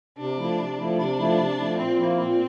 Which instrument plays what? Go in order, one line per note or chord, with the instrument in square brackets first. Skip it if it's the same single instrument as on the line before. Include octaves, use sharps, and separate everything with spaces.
[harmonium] C3 [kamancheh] D4
[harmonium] F3 A3 E4
C3
F3 A3 E4
[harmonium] C3 [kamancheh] D4
[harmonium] F3 A3 E4
C3
F3 A3 E4
[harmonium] A#2 [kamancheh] C4
[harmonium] F3 A#3 E4
[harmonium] A#2 [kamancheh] C4